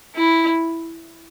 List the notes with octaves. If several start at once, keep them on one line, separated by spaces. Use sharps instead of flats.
E4